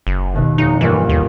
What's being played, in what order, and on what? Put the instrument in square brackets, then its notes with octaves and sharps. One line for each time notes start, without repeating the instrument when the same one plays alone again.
[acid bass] F#1
[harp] D#2 B2 D#3
[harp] F1 C#7 [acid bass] D#4
[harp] G1 A#3 F4 [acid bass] E3
[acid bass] D#2